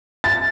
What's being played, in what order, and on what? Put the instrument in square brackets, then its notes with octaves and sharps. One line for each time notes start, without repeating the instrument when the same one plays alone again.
[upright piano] A6